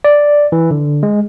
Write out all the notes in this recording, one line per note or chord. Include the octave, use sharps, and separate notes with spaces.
D5
E3
D3
G#3